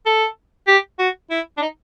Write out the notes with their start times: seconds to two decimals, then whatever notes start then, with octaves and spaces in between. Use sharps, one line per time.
0.06 A4
0.68 G4
0.99 F#4
1.30 E4
1.57 D4
1.62 D#4